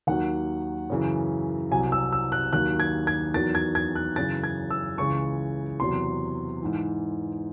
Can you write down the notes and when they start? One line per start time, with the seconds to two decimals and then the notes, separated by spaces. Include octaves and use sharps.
0.07 D#2 D#3 F#3 F#5
0.90 F#2 C#3 E3
1.71 C2 C3 F#3 G#5
1.92 E6
2.12 E6
2.32 F#6
2.53 D#2 D#3 F#3 F#6
2.80 G#6
3.07 G#6
3.34 E2 D#3 F#3 A6
3.55 G#6
3.75 G#6
3.95 F#6
4.16 F#2 C#3 E3 A6
4.44 G#6
4.70 E6
4.97 C#2 C#3 E3 C#6
5.80 E2 C3 F#3 C6
6.62 G#2 E3